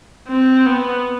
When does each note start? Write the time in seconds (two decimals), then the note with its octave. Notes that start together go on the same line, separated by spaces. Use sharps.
0.28 C4
0.67 B3